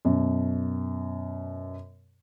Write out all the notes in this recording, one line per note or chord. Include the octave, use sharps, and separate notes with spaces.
F#2 B2